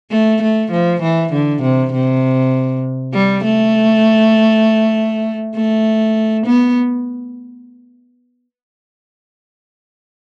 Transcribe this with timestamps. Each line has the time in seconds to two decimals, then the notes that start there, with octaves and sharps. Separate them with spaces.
0.11 A3
0.42 A3
0.71 F3
1.02 E3
1.32 D3
1.62 C3
1.93 C3
3.14 G3
3.44 A3
5.55 A3
6.46 B3